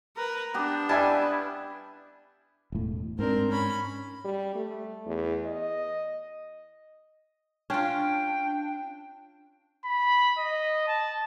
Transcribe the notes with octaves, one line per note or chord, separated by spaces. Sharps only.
A#4 B4
B3 D4 G4
G3 E4 B4 E5 G#5 A5
E1 A2
G#2 C4 D4 A#4
C#4 B5
G3
A3
E2
D#5
C#4 D4 F4 G5
B5
D#5
A5